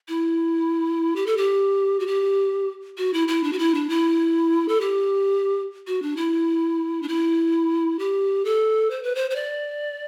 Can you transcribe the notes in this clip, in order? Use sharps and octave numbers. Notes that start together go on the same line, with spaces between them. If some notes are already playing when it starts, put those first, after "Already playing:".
E4
G4
A4
G4
F#4
G4
F#4
E4
E4
D4
F#4
E4
D4
E4
A4
G4
F#4
D4
E4
D4
E4
G4
A4
C5
B4
C5
C5
D5